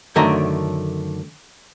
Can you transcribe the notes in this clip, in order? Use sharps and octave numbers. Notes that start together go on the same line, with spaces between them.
F#2 D3 D#3 A3 C#5 A#5